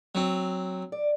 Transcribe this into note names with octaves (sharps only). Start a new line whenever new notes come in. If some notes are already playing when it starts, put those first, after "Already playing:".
F#3 C4
D5